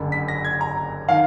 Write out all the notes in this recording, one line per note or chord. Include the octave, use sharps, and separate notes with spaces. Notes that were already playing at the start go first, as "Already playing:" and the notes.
Already playing: F#1 F#2 D3
B6
A#6
G#6
A#5
D#3 F5